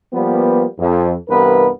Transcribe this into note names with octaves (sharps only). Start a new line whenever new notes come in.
F3 G3 A#3 B3
F2
C2 G2 E3 B3 A#4 B4